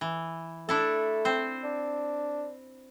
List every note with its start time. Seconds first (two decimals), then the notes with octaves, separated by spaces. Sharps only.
0.01 E3
0.69 A3 D4 E4 A4
1.25 C4 C5
1.64 D4